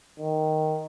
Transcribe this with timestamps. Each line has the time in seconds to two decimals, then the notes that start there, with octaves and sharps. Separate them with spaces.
0.19 D#3